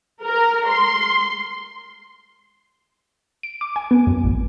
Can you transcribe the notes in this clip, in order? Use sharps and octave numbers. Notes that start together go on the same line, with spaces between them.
A#4
C6
D7
D6
G#5
B3
F#2
A1